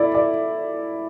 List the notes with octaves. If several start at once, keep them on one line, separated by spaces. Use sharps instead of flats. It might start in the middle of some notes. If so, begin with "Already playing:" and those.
Already playing: E4 A4 D5
D5